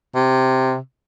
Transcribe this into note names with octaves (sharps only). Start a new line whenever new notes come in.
C3